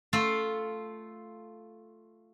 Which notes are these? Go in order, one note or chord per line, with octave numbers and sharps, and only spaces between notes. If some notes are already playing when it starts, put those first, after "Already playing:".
A3 F4 A4